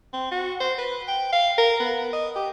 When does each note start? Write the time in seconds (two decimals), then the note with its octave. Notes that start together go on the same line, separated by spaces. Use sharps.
0.13 C4
0.31 F#4
0.60 C5
0.78 B4
1.08 G5
1.32 F5
1.58 A#4
1.80 B3
2.13 D#5
2.35 G4